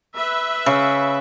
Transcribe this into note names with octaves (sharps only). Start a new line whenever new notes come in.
B4 E5
C#3